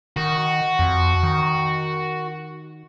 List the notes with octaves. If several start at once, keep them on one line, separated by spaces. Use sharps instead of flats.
D#3 F#4
F2
D#3